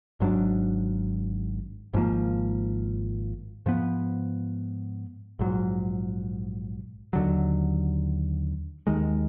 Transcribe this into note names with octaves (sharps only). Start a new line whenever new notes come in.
G#1 G#2 F#3 D4
G#1 G#2 F3 A#3
G#2 F3 B3
A#1 G#2 F#3
D#2 D3 F#3
D#2 D#3 G#3